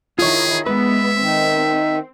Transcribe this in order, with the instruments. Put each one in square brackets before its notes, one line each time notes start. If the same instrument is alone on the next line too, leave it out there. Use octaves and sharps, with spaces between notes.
[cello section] D#3 E4 [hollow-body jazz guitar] F4 C#5 [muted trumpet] G#4
[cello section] G#3 B3 [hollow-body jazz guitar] B4 [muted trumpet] E5
[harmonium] D#3 [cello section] C4